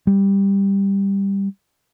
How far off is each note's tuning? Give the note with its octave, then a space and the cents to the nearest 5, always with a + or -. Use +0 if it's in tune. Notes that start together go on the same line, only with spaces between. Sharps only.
G3 +10